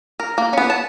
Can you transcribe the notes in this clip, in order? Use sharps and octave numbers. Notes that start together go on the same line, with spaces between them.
A#4
A#3
B3 C#4
A5